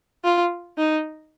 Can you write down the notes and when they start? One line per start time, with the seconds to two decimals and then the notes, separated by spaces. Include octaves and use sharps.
0.24 F4
0.78 D#4